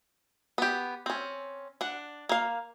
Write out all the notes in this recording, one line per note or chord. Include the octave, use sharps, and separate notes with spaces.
B3 G4
C4 C#4
D4 F#5
A#3 F5